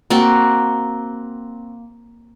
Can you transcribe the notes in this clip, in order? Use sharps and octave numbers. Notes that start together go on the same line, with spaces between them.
A#3 C4 F#4